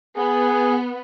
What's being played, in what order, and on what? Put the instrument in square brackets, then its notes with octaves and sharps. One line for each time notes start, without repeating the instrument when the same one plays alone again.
[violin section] B3 [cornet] G#4